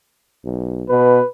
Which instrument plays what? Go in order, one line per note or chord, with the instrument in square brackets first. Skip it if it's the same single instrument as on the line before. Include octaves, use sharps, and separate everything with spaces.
[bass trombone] B1
[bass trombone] B2 [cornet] B4